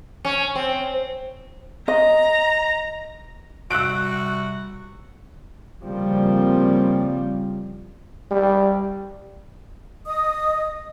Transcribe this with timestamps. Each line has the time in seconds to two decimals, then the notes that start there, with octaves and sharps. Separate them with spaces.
0.25 C#4
0.55 C4
1.88 D#5 A#5
3.71 C3 G3 F#4 E6 F#6 D7
5.84 C#3 F3 G3 A#3 C4
8.31 G3
10.06 D#5 D#6